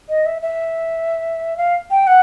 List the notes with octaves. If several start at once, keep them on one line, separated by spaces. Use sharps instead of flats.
D#5
E5
E5
F5
G5
F#5